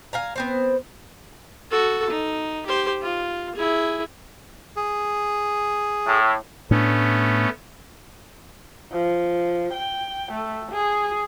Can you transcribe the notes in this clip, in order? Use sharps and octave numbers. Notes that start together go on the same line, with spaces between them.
F5 G#5 A#5
B3 C4 C5
F#4 A4
D#4
G4 C5
F4
E4 G#4
G#4
A2
A2 A3 B3 C#4 D4
F3
G5
A3
G#4